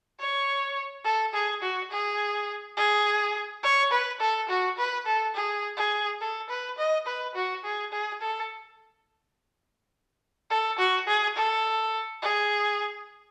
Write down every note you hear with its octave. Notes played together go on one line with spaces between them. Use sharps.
C#5
A4
G#4
F#4
G#4
G#4
C#5
B4
A4
F#4
B4
A4
G#4
G#4
A4
B4
D#5
B4
F#4
G#4
G#4
A4
A4
F#4
G#4
A4
G#4